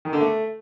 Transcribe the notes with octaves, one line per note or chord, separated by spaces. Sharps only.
D#3
D3
A3